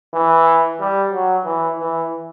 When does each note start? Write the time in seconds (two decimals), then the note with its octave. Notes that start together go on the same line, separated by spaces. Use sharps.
0.14 E3
0.80 G3
1.12 F#3
1.45 E3
1.79 E3